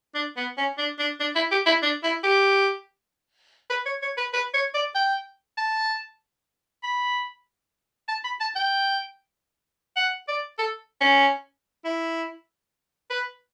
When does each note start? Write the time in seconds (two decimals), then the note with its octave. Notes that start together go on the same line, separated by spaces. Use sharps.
0.15 D4
0.37 B3
0.58 C#4
0.78 D4
0.99 D4
1.20 D4
1.35 E4
1.52 G4
1.66 E4
1.82 D4
2.03 E4
2.23 G4
3.70 B4
3.86 C#5
4.02 C#5
4.17 B4
4.33 B4
4.54 C#5
4.74 D5
4.95 G5
5.58 A5
6.83 B5
8.08 A5
8.24 B5
8.40 A5
8.56 G5
9.96 F#5
10.28 D5
10.58 A4
11.01 C#4
11.85 E4
13.10 B4